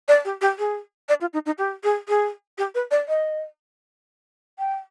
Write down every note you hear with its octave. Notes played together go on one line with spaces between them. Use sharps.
D5
G4
G4
G#4
D5
F4
D#4
D#4
G4
G#4
G#4
G4
B4
D5
D#5
G5